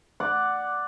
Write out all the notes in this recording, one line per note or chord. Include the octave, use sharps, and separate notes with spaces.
D5 F#5